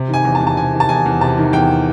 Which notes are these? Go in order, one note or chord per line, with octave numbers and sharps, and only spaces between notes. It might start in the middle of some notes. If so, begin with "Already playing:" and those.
Already playing: C3
D#3
G#5
E2
A5
E2
A5
C3 G#5
D#3
A5
E2 G#5
E2
C3 A5
D#3
E2 G5